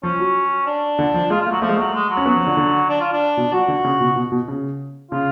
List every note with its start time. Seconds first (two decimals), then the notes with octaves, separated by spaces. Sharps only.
0.03 F3 C#4
0.20 F#3
0.66 D4
0.99 D3
1.14 F3
1.30 G#3 F4
1.41 F4
1.46 A3
1.51 F#3
1.62 F3 A3
1.69 G#3
1.77 F#3 A3
1.94 G#3
2.10 F#3
2.17 C#4
2.25 F#3 B3
2.36 F3
2.46 D3
2.57 D3
2.89 D4
3.01 F4
3.13 D4
3.37 B2
3.53 F#3 F#4
3.68 D3
3.85 C#3
4.01 B2
4.16 B2
4.32 B2
4.48 C#3
5.11 C#3 F4